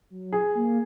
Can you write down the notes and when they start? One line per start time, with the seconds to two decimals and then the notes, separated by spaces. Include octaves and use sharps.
0.10 F#3
0.32 G#4
0.55 A#3